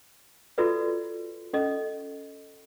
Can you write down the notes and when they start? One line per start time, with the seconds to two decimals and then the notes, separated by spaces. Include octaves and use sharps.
0.58 F4 F#4 A4 B4 D5 E5
1.53 C#4 A4 D#5